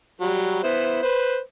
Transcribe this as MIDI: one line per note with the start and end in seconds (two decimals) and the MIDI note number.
0.21 0.63 54
0.21 0.63 55
0.64 1.01 59
0.64 1.01 64
0.64 1.01 72
1.03 1.38 71
1.03 1.38 72